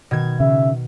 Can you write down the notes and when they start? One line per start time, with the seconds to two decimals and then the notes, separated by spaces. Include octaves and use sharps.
0.11 B2 D#3 G#6
0.40 C#3 E5